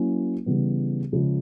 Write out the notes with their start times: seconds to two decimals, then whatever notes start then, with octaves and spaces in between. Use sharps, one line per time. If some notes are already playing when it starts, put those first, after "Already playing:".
Already playing: F#3 A#3 C#4 E4
0.46 C#3 E3 G3 B3
1.12 C#3 F3 G#3